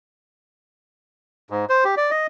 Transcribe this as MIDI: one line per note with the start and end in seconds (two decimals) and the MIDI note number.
1.50 1.65 44
1.69 1.84 72
1.84 1.95 67
1.97 2.11 74
2.11 2.27 75